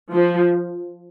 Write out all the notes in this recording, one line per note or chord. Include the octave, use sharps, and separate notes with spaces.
F3